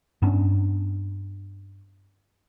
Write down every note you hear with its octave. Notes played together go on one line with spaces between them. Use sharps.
G2 B3 C#4 D4